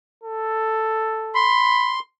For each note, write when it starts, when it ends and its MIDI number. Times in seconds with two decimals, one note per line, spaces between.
0.24 1.52 69
1.35 1.99 83
1.35 1.99 84